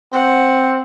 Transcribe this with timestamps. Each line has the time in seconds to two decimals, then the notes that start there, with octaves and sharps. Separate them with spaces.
0.13 C4 F#5